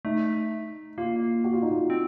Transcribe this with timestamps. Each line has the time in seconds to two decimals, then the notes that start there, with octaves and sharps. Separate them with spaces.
0.05 A3 D#4
0.98 A#3 F4
1.44 F#4
1.53 F4
1.62 D#4
1.71 F4
1.90 C4